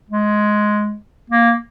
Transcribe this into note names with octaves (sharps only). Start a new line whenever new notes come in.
G#3
A#3